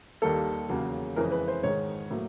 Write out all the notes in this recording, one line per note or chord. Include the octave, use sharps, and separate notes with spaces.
D#2 D#3 G3 A#3 A4
E2 C#3 F#3 A#3
F2 C#3 E3 G#3 A#4
B4
C5
G#2 D#3 G#3 C#5
A2 F#3 A#3